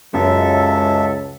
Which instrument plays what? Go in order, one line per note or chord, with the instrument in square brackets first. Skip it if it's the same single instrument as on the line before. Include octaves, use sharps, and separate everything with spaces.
[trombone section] C#2 [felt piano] F#2 [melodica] A4 E5